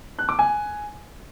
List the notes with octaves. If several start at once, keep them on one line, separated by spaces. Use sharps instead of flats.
F#6
D6
G#5